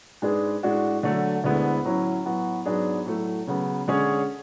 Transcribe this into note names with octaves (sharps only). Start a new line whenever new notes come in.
G#2 G#3 D4 G#4 B4
A2 G#3 D4 F#4
D3 F#3 A3
D2 D3 G#3 B3 E4
A2 F#3 C#4 E4
A2 F#3 B3 F#4
G#2 F#3 B3 D4 G#4
A2 F#3 A3
C#3 F#3 B3
D3 G#3 C#4 G#4 C#5